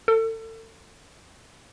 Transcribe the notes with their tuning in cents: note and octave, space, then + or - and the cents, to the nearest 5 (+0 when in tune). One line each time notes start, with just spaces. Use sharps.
A4 +35